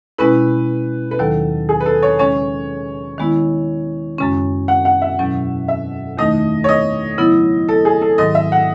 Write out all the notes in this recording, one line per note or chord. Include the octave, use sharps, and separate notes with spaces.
B2 G#3 C#4 E4 B4
B4
D#2 D#3 F#3 A4
G#4
B4
A4
C#5
D#2 C#3 G#3 C#4 C#5
D#3 G#3 B3 E4
F#2 C#3 G#3 C#4
F#5
F#5
E5
E2 B2 F#3 C#4
E5
E2 D#3 A3 D#4 D#5
C#5
D#5
C#3 F#3 B3 E4
A4
G#4
A4
G#2 D#3 F#3 D#5
E5
F#5